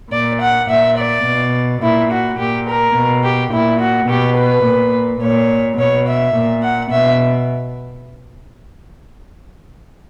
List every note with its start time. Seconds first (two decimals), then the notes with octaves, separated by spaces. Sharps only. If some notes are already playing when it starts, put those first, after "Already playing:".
0.12 A#2 D5
0.41 F#5
0.69 A#2 E5
0.97 D5
1.25 B2
1.82 A#2 E4
2.11 F#4
2.38 A#2 G4
2.67 A#4
2.95 B2
3.24 G4
3.52 A#2 E4
3.80 F#4
4.08 B2 G4
4.36 B4
4.65 A#2
5.21 A#2 C#5
5.78 B2 C#5
6.06 E5
6.35 A#2
6.62 F#5
6.90 B2 E5